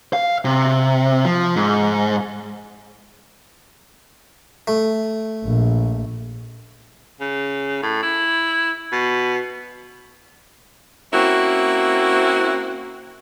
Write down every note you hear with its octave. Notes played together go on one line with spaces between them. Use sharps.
F5
C3
F3
G#2
A3
A#1
C#3
A2
E4
B2
A#3 C4 C#4 E4 F#4